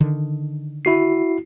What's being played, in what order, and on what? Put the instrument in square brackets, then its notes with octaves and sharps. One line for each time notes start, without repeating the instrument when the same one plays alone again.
[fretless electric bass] D3 D#3
[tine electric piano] E4 F#4 C7